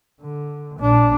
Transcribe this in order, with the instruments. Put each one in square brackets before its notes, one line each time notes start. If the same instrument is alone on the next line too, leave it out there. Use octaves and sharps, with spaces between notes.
[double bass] D3
[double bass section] A#1 A#2 [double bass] D4